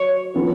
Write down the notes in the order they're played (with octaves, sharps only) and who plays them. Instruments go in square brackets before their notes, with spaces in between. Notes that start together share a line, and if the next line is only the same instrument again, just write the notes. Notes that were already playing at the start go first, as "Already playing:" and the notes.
Already playing: [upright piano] F#3 [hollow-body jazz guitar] C#5
[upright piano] F3 B3 F4 G#4 B4